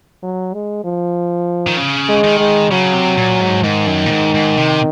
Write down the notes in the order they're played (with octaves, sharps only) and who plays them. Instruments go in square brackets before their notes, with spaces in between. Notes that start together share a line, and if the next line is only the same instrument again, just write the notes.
[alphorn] F#3
G#3
F3
[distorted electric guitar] D#3
C#3
[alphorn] G#3
[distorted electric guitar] D#3
[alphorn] G#3
[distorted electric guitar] C#3 [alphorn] F#3
[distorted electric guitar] C3
A#2
G#2
[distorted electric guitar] G#2 [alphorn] D#3
[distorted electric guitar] F#2
A#2
G#2
G#2
C3